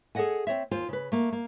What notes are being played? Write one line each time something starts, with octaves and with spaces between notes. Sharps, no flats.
G#4 A4 D5 D#5 F#5 G#5
C4 C#5 E5
D#2 F4 C5 G#5
C#3 B4
A3 A#3
A#3